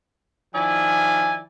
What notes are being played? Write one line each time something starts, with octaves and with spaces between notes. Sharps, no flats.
D#3 F3 E4 D5 G#5